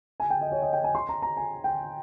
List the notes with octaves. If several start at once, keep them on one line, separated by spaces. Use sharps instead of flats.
G#5
G5
D#5
C#5
D#5
G5
G#5
C6
A#5
A#5
G#5
G5